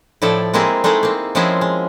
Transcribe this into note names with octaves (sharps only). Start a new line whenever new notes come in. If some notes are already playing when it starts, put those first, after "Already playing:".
A2 F3 E4 A4 D5 G5
G#3 A#3 C4 E4 G#4 A#4
G#3 A3 D#4 E4 G#4
A#3 C4
F3 G#3 C4 C#4 E4 G#4
G#3